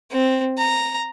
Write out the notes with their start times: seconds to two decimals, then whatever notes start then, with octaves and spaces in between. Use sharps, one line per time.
0.12 C4
0.58 A#5